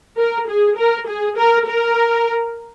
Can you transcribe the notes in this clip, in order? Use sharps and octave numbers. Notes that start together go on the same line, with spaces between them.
A#4
G#4
A#4
G#4
A#4
A#4